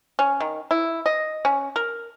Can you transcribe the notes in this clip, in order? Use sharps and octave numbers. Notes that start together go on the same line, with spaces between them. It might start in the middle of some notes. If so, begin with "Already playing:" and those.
C#4
D#3
E4
D#5
C#4
A#4